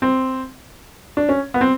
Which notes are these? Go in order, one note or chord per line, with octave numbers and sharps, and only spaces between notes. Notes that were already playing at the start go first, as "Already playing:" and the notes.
C4
D4
C#4
B3
C4